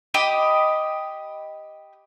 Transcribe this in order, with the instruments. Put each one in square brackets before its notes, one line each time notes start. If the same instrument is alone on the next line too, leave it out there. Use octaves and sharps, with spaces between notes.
[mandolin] G4 D#5 B5